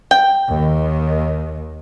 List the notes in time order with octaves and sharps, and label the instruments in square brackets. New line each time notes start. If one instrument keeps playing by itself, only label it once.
[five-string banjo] G5
[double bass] D#2 D#3